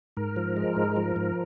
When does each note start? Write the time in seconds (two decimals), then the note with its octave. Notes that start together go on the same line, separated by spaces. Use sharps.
0.17 G#2 A#4
0.36 F3
0.57 G#3
0.76 G#2
0.96 F3
1.16 G#2